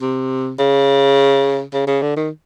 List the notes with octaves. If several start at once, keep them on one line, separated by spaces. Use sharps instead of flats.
C3
C#3
C#3
C#3
D3
D#3